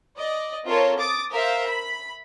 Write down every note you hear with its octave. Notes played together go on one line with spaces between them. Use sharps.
D5 D#5
C4 F4 A4 A#4 C#5
D6 D#6 A6 D7
A#4 C5 E5 F5
B5